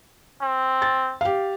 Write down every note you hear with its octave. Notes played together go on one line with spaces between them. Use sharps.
C4
A6
G4 F5